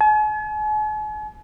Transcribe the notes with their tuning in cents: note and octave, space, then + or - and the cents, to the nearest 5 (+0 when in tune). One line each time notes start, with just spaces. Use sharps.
G#5 +45